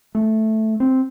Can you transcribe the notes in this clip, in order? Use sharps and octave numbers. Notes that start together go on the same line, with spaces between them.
A3
C4